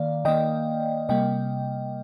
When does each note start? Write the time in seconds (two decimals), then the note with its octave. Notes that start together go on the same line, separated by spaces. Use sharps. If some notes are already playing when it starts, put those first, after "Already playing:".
Already playing: D#3 A#3 D5 F5
0.25 D#3 A#3 D#5 G5
1.09 C3 G3 A#3 D#5 G5